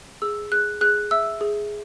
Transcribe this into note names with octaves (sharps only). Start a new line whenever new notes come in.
G#4 E6
G#4 F#6
G#4 F#6
E5 E6
G#4